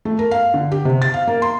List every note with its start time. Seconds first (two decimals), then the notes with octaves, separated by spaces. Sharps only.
0.05 A3
0.19 A#4
0.31 F5
0.54 D3
0.71 G4
0.85 C3
1.02 A6
1.14 F5
1.27 A#3
1.42 C6